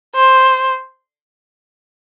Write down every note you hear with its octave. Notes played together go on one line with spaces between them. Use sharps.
C5